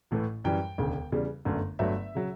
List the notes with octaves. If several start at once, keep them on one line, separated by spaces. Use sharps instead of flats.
A1 A2 E3 A3
F#2 E3 G3 G5
E1 D2 C#3
E2 C#3 G3
G1 F#2 D3 A3
G1 G2 F#3 A3 E5
C#3 F#3